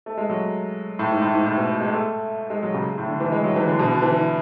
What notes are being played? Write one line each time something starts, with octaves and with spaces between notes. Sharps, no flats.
A3
G#3
F#3
A2
G#2
A2
G#2
A2
B2
G#3
A3
G#3
F#3
C#3
A2
D3
E3
G#3
F#3
E3
D3
B2
D3
E3
E3